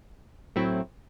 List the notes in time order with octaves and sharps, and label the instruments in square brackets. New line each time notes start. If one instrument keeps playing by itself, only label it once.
[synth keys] A2 F#3 A3 C4 E4